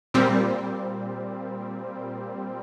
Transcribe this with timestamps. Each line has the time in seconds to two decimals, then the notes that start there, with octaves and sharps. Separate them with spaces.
0.14 A#2 G3 C4